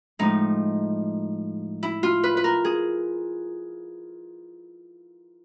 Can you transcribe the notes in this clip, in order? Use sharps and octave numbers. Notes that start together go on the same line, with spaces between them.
A2 F3 G#3 D#4
E4
F4
B4
B4
A#4
G#4